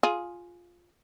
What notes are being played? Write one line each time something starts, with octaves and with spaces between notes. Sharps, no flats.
F4 G#4